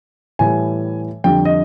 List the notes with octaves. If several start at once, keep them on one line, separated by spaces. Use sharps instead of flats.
A2 E3 G3 G#5
F2 D3 G3 G5
D#5